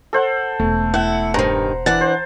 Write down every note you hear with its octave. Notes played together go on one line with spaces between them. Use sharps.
A4 C5 F#5
E1 A3
E4 F#5
G2 D#3 C5 A#5
E3 D4 F#5 A6
C5